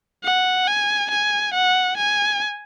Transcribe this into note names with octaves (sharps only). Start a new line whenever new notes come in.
F#5
G#5
G#5
F#5
G#5